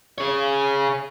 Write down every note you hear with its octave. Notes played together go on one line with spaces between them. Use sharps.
G#4 C#5